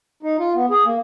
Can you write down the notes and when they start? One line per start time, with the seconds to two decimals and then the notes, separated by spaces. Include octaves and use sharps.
0.23 D#4
0.39 F4
0.55 B3
0.70 G#4
0.85 A#3